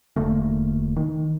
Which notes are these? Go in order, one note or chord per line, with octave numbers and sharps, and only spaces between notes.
E1 D3 A3 A#3
D#3